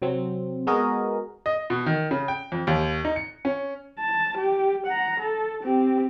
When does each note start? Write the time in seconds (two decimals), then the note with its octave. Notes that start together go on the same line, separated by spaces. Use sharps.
0.02 C3 F#3 C4
0.67 G#3 B3 F#4 G#4 A#4 D#5
1.46 D#5
1.70 B2
1.86 D#3
2.11 C#3
2.28 G5
2.52 F2
2.67 D#2
3.05 D#4
3.16 C#7
3.45 C#4
3.99 A5
4.37 G4
4.86 F#5 A#5
5.20 A4
5.63 C4 G4